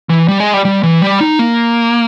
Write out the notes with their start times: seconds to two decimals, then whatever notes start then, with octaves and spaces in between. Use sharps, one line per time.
0.09 E3
0.28 G3
0.40 G#3
0.54 G3
0.65 G3
0.83 E3
1.02 G3
1.20 D#4
1.39 A#3